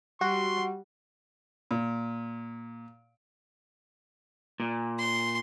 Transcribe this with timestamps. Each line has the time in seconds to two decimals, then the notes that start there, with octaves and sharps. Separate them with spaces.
0.21 G3 F#4 C6
1.71 A#2
4.60 A#2
4.99 C6